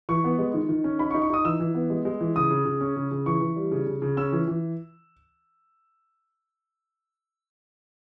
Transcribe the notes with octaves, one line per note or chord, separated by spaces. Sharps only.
E3 C#6
B3
G#3
D#3
D#3
C#4
D#4 B5
C#6
D#4
C#6
D#4 D#6
E3 E6
E3
B3
G#3
G#3
E3
C#3 D#6
C#3
C#3
C#4
C#3
C#3
E3 C#6
E3
G3
C#3
C#3
C#3
C#4 E6
E3
E3